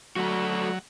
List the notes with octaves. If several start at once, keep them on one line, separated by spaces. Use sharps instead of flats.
F#3 A3 F#4